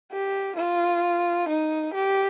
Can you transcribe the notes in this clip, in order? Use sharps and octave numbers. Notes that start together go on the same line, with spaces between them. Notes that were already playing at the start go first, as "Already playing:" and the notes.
G4
F4
D#4
G4